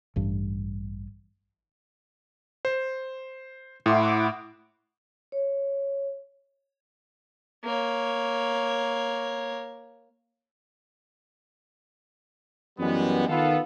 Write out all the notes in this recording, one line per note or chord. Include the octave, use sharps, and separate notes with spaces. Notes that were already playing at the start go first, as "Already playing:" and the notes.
A1 G2
C5
A2 E4 F#5 C6 D6
C#5
A#3 C#5
F#2 E3 G3 G#3 B3
D#3 B3 F4 A4